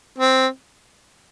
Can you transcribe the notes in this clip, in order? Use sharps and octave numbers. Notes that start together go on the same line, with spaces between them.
C4